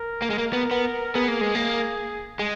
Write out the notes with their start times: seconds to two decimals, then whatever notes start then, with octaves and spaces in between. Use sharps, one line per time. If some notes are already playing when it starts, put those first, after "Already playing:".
Already playing: A#4
0.22 A#3
0.30 G#3
0.38 A#3
0.53 B3
0.71 B3
1.15 B3 G#4
1.28 A#3
1.41 G#3
1.55 A#3
2.39 G#3